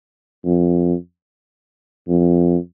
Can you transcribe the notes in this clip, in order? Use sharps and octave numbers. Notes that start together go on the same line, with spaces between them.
F2
F2